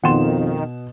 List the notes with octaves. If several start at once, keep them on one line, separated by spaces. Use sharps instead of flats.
F2 B2 D#3 F#5 G5 C6 E7